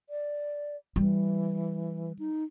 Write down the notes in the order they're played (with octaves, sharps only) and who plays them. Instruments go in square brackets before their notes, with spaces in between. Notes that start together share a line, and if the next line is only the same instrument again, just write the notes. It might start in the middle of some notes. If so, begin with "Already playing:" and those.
[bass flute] D5
[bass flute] E3 [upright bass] G3
[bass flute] D#4